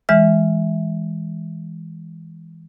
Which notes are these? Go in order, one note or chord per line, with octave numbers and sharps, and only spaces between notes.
E3 G#3 E5 F6